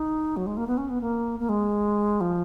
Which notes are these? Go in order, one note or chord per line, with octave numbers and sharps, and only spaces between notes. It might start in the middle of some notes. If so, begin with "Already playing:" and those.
Already playing: D#4
F#3
G#3
A#3
B3
C#4
B3
A#3
A#3
G#3
F3